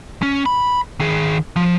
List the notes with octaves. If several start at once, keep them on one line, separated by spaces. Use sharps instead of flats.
C#4
B5
D#3 G#4
F3